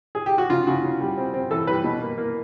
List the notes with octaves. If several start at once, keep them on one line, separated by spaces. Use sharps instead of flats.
G#4
G4
F#4
C#3 F4
C#3 F#4
C#3
G3
C4
C4
E3 A4
G3 B4
B2
A#3
A#3